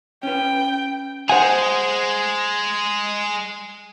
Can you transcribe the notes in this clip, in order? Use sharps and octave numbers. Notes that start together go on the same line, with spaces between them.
C#4 B4 G5
G#3 G#4 C5 F#5 G#5